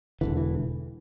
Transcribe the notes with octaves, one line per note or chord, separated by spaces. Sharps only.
E1 D2 D3 E3
E3